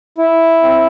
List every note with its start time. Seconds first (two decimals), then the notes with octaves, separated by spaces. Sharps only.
0.18 E4
0.63 C4